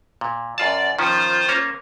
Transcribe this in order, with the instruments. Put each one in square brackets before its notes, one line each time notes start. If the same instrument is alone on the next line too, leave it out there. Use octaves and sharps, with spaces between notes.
[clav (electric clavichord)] A#2
[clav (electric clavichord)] F#2 F4 A5 [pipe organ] D5
[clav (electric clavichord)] D#3 F3 C#4 [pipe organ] F4 C5
[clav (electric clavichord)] A#3 C#4 C#5